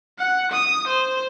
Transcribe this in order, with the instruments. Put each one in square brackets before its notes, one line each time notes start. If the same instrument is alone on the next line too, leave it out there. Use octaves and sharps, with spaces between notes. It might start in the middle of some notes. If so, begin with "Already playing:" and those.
[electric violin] F#5
D#6
C5